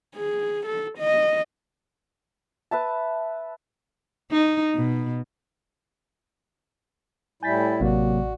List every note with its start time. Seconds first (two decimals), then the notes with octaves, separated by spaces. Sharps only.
0.15 G#4
0.66 A4
0.99 D#5
2.71 B4 E5 A5
4.31 D#4
4.75 B2
7.43 A2 G3 E4 G#5 G6 A6 B6
7.80 A1 C3 F#3 A#3 F#4 D5